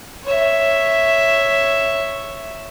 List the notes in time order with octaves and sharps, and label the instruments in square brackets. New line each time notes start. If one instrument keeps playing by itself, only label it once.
[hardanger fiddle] C#5 E5